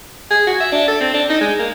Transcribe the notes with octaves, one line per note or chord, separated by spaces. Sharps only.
G#4
F#4
E5
D4
A4
C4
D4
D#4
G#3
A#3